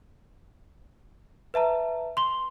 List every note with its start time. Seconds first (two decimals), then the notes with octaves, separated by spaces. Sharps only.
1.54 B4 E5 A5 A#5
2.17 C6 G7